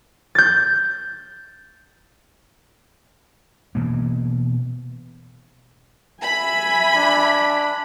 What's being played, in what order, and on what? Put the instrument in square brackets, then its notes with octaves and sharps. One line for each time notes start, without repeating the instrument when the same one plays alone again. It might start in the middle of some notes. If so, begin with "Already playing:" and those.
[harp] G6 A6
[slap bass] B2 E3 A#3
[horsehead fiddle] E5 G#5 [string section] B5
[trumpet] D4